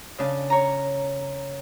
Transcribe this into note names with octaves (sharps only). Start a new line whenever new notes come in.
C#3 D4
C#5 A#5